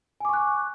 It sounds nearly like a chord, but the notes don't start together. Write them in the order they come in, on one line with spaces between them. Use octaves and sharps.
G#5 D6 C#6 F#6